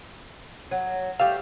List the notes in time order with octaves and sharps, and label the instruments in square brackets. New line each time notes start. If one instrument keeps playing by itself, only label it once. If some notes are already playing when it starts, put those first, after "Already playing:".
[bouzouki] F#3
[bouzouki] G3 A3 G4 [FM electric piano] F5 E6 F6